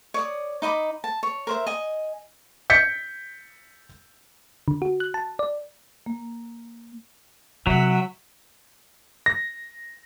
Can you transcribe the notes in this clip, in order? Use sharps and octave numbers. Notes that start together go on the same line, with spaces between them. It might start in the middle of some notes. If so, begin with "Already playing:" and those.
C#5 D5 D#6
D#4 D#5 B5 D6
A5
C#5
A#4 C5 E5
D#5 G#5
G6 B6 C#7
D3
F#4
F#6
A5
D5
A#3
C3 F#3 E5 F#5
A#6